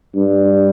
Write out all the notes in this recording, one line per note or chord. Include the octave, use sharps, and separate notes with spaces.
G2